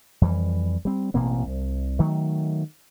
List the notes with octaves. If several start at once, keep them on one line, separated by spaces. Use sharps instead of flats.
F2 E3 G3
G3 C4
A1 B2 A#3 C4
C2
D#3 F#3 A3